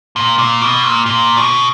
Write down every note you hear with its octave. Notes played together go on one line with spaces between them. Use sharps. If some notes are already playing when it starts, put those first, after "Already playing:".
A#2
A#2
B2
A#2
A#2
B2